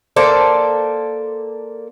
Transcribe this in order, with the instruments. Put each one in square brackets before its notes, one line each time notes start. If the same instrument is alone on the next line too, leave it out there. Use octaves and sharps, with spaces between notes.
[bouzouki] A#3 A4 C5 D5